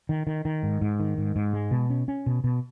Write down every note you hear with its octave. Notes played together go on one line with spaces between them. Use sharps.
D#3
D#3
D#3
G#2
G#2
D#3
G#2
G#2
G#3
B2
C#4
C#4
B2
B2